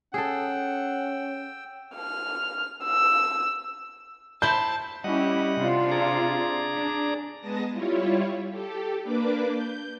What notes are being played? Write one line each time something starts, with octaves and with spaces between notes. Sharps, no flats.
C#4 G#4 A4 F#5 G5 E6
F6
E6
E4 C5 G5 A5 G6
G3 C#4 E4 G4 D#5 F#5
C3 D4 F4
G#4 D5 A#5
D4
G#3 B3 A5 D#6 A#6
G3 E4 F4 C#5
G4 A4
A#3 D4 B4 D6
G6